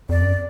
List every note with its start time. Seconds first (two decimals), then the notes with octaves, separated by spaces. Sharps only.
0.09 F2 D5
0.21 F#2